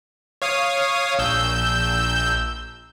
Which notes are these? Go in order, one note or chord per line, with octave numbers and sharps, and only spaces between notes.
C#5 F5 D#6
A#1 E6 G6